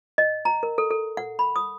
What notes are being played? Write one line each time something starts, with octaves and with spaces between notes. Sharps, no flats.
D#5
A#5
A#4
A4
A4
F#5
B5
D#6